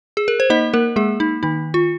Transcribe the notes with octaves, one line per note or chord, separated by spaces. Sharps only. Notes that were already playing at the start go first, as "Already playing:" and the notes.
G#4
A#4
C5
A#3 D#4 D#5
A#3 A#4
G#3 A#3 G#4
D#4
D#3 D#4
F4